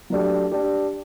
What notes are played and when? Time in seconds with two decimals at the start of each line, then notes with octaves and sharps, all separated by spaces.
0.10 F#3 A3 D4 G4
0.52 D4 G4